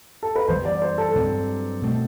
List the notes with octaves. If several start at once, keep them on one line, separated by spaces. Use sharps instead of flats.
A4
B4
F#2 E3 G3 B3 C5
D5
C5
A4
G2 F#3 C4
B2 A3 C4